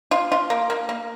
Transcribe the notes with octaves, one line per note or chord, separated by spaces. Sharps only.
F4
F4
A#3
A#3
A#3